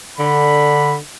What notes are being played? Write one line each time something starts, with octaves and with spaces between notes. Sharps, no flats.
D3 B5